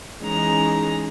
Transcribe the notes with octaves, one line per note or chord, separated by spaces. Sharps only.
E3 G#3 C#4 D#4 A#5